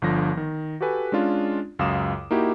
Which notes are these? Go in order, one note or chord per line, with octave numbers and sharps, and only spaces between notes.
G1 D3 F3 A#6
D#3
F#4 G4 A4 B4 G#5
G#3 C#4 D4 F4
C#2 F#2 F5 D6 D#6 E7
A#3 D#4 E4 F#4 G4